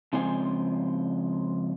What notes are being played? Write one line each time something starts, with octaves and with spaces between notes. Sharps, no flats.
C#3 F3 G#3 C4 C5 G#5